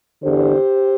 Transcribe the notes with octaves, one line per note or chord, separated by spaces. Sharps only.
E2 D3 G4 C5